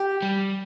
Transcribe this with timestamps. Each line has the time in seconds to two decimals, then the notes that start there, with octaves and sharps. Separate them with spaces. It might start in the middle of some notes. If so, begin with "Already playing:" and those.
Already playing: G4
0.22 G3